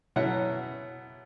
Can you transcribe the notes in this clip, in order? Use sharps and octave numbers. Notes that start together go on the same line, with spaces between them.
B2 F#3 C#4 E4 F#5